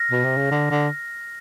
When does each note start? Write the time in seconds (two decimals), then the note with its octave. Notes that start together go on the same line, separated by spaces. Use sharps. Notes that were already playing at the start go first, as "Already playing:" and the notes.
Already playing: F6 A#6
0.11 B2
0.24 C3
0.37 C#3
0.51 D3
0.71 D3